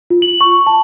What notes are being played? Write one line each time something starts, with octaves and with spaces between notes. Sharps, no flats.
F4
F#7
C#6
A5